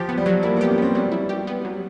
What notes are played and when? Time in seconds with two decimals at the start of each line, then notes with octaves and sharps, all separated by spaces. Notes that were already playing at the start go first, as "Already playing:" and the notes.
Already playing: F3 G4
0.09 B3
0.17 G3
0.26 F#3
0.43 A#3 E4
0.56 B3 G4
0.69 C#4
0.78 B3 C4
0.95 F#3 G3
1.12 E4
1.29 G4
1.47 B3
1.65 F#3